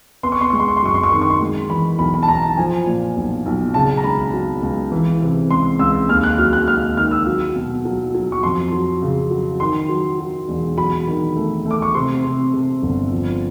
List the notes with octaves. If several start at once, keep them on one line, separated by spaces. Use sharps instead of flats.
B3 C6
C#6
C6
G#3 C#6
C6
C#6
C6
F#2 C#6
C6
C#6
D#3 C6
C#6
C6
G#3
E3 B5
B1 B5
B5
A5
B1 A#5
A5
F3 G#5
A#2
B1
B1
C#3 A5
A#5
C#2 B5
F#3
C#2
E3
C3
C#2 C6
C#2 E6
D#2 F6
F#6
F#3 F6
F#6
D#2 F6
D#3 F6
E6
F#3
B2
F#3
F#3
C#6
F2 C6
F#3
C#3
F#3
D#3 C6
F#3
F#3
E1
F#3 B5
D#3
A3
A3
D6
C#6
C3 C6
C3
C3
G1
F3